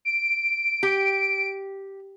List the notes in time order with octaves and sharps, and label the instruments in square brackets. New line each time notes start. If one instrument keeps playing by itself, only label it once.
[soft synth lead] D7
[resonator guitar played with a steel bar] G4